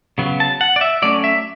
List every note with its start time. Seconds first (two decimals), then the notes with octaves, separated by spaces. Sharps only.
0.18 C#3 F#3 B3
0.40 A5
0.61 F#5
0.76 D5
0.81 E5
1.02 F#3 A3 C#4 D5
1.24 E5